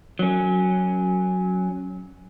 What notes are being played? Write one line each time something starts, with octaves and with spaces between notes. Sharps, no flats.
F#3 C#4